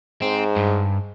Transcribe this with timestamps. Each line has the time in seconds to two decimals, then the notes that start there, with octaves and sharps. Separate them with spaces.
0.22 G#2 C4
0.56 G2